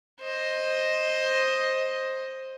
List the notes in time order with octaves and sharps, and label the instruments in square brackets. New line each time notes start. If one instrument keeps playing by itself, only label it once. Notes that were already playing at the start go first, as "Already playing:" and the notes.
[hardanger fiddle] C5 D#5